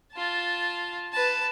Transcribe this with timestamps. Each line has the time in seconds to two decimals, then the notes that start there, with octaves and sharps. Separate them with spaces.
0.13 F4 A5
1.13 B4 A5